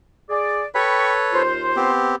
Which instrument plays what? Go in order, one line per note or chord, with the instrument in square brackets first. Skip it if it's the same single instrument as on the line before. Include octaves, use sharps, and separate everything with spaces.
[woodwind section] G#4 D5
[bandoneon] A4 B4 C#5 [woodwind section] G5 B5 C#6
[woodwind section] D#2 F4 C5
[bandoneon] B3 C4 G4